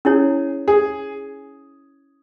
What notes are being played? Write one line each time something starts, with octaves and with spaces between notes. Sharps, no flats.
C#4 E4 G#4 C#5
G#4